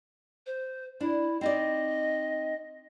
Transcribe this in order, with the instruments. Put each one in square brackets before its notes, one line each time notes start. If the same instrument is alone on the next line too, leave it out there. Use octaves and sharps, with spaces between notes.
[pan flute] C5
[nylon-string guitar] D4 [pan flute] E4
[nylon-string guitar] C4 D#4 D5 [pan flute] D#5